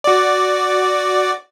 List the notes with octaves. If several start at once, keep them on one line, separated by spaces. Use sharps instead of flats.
F#4 D5